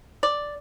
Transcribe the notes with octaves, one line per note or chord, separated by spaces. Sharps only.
D5